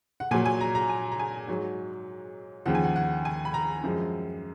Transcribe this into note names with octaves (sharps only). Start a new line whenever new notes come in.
F#5
A#2 F#3 G#5
G#5
A#5
A#5
G#5
A#5
G#5
G#2 F#3 C#5
D#2 C#3 F3 F#5
G#5
F#5
F#5
G#5
B5
A#5
F#2 F3 G#3